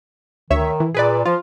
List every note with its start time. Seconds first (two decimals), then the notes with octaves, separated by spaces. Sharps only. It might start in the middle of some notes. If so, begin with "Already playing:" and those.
0.50 D2 D#3 C#5 E5
0.80 E3
0.94 A#2 G#4 B4 D5
1.25 F3 F4